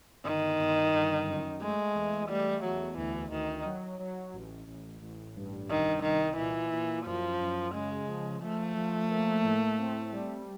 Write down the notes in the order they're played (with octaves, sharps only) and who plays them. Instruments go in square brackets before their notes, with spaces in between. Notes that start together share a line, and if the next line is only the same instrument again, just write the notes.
[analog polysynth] G1 [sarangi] D#3
[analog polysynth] G1
G1
F#2
[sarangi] G#3 [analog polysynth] A3
[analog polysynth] E2
[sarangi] G3 [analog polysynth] A3
[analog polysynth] E2 [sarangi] F#3
[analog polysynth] D2 [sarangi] E3
[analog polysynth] D2 [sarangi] D#3
[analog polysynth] F#3
F#3
A1
A1
A1
G2
[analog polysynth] C2 [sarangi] D#3
[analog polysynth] C2 [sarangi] D#3
[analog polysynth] A#2 [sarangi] E3
[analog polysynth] A#2
[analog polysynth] F#2 [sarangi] F3
[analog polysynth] F#2
[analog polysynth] C#3 [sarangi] G#3
[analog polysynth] F3
[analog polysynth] F3 [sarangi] A3
[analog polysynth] F3
A#3
A2
C4
G3